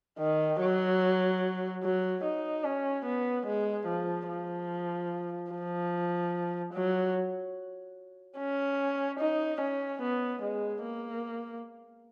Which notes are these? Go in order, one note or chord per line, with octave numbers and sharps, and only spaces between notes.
D#3
F#3
F#3
D#4
C#4
B3
G#3
F3
F3
F3
F#3
C#4
D#4
C#4
B3
G#3
A#3